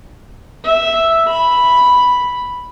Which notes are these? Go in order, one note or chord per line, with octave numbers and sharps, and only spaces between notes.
E5
B5